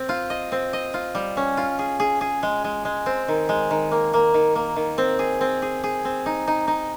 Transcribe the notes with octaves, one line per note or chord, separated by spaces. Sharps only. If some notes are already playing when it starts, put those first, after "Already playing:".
Already playing: C4
F4
D#5
C4
D#5
F4
G3
C#4
F4
G#4
G#4
G#4
G#3
G#3
G#3
C4
D#3
G#3
D#3
A#3
A#3
D#3
A#3
D#3
C4
G#4
C4
G#4
G#4
C4
D#4
D#4
D#4